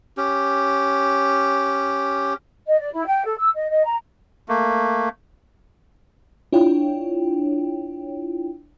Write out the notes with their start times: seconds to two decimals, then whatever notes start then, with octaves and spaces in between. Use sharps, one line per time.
0.17 C#4 G4
2.67 D#5
2.79 D5
2.92 E4
3.06 G5
3.24 A4
3.38 E6
3.56 D#5
3.69 D#5
3.85 A#5
4.49 A3 A#3
6.52 D4 E4 F4 C#5 G5